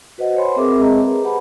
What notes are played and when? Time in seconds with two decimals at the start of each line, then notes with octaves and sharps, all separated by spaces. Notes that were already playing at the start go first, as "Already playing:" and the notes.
0.18 F#4 B4 C5 D#5 F#5
0.36 C5 C#5 F#5 G#5 B5 C6
0.56 C4 G#4 A#4 E5 D6
0.78 G#3 C4 G#4 D#5 A5 A#5
0.92 B4
1.23 G4 B4 C5 F#5 A5 B5